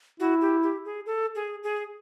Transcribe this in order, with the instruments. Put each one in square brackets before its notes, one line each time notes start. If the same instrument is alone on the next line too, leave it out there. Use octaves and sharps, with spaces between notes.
[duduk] E4 [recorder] F#4
[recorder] G4
G4
G#4
A4
G#4
G#4